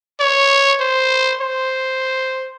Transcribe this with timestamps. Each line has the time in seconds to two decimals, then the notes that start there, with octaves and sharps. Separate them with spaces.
0.20 C#5
0.80 C5
1.41 C5